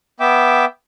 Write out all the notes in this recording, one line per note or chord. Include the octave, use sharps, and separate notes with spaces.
B3 E5 G5 D6